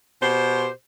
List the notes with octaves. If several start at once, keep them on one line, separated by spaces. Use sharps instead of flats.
B2 G4 C5